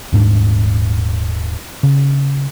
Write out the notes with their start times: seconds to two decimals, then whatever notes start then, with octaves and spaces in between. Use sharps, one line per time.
0.12 D#1 G#2 C4 D4
1.83 C#3